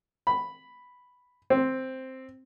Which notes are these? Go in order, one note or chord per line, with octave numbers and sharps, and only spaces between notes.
B5
C4